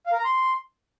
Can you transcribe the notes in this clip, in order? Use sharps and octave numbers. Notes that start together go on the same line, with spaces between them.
F5
A#4
A#5
C6